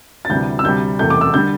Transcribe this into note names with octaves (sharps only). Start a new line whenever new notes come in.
A6
D2 C3 E3 G3 G6
E6
D2 C3 G3 G6
E1 E2 C3 A3 G6
D6
E6
D3 G3 G6